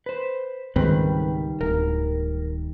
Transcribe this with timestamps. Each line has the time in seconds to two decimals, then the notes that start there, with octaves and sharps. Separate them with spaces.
0.06 B4 C5
0.76 C#2 G#2 D#3 G3 C4 B4
1.61 D1 A#4